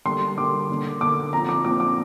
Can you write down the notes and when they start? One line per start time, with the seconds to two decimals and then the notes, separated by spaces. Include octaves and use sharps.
0.05 D3 G3 A#3 C6
0.37 D3 G3 A#3 D6
0.69 D3 A#3 D4
1.01 D3 A#3 D4 D6
1.33 A#2 F3 C4 A#5
1.49 D6
1.64 A#2 F3 C4 D6
1.80 D6